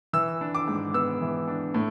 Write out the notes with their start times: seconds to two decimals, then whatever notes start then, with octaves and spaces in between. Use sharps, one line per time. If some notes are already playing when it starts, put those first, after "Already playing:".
0.13 E3 E6
0.41 D4
0.55 D6
0.68 G#2
0.94 B3 E6
1.22 E3
1.48 D4
1.74 A2